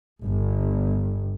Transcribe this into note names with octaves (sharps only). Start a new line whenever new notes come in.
G1